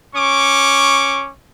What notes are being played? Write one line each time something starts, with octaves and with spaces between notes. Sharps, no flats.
C#4 C#6 D6